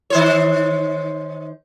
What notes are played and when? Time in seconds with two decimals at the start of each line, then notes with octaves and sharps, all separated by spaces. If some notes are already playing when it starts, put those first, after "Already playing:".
0.10 D#3 C5 C#5